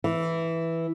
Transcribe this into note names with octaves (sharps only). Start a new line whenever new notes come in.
E3